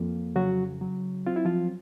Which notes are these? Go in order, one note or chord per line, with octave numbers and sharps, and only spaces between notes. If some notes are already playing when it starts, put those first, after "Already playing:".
Already playing: F2 A#3
C#3 F#3 F#4
F#3
C4 F4
E4
F3 F4